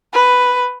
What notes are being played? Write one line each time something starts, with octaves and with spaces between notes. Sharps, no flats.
B4